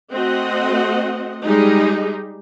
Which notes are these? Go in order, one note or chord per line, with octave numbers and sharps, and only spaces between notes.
A3 C4 F#4 D#5 F#5
G3 G#3 D#4 G4 G#4